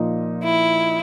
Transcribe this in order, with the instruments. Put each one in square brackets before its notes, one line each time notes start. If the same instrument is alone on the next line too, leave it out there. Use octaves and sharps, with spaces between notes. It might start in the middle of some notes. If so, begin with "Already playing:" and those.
Already playing: [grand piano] A#2 F3 A#3 D#4
[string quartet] E4